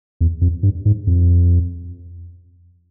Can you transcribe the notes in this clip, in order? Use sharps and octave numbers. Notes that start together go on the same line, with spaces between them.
E2
F2
G2
G#2
F2